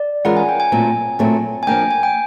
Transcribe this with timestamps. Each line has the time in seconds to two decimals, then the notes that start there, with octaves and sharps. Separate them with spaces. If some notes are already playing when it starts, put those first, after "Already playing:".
Already playing: D5
0.25 E3 G#3 C#4 F4 A#4 F#5
0.37 G#5
0.49 G5
0.60 G#5
0.72 A#2 F#3 A3 C4
1.19 A#2 F#3 A3 C4
1.63 G#5
1.67 F3 A#3 D4 G5
1.91 G#5
2.03 G5